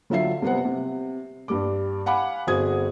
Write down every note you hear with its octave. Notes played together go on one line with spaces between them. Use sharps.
D3 F#3 F4 E5 C7
C3 G3 B3 C4 F#5
C3
G2 G3 D6
F5 F#5 G#5 B5 D6
G1 C4 F#4 G#4 D#6 G#6